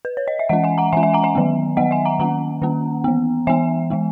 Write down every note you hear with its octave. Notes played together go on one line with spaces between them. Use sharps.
B4
C#5
D#5
E5
E3 G#3 C#4 D#5 F#5
E5 G#5
F#5 A#5
E3 G#3 C#4 E5 G#5
E5 G#5
F#5 A#5
E5 G#5
D#3 F#3 B3
D#3 F#3 B3 D#5 F#5
E5 G#5
F#5 A#5
D#3 A#3 C#4 F#5 A#5
D#3 A#3 C#4
E3 B3
E3 B3 E5 G#5
E3 G#3 B3